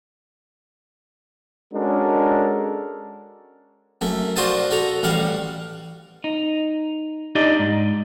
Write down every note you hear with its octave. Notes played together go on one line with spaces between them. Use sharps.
G#3 C#4 D4 F#4 A4 A#4
F#2 A3
D4 F4 F#4 C5 D#5 A5
F#4 A4 A#5
A1 G3 F5 F#5
D#4
D4 D#4 G4 D5 D#5
G#2